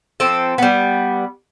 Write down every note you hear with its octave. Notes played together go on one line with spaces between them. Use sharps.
F3 C4 A4
G3 B3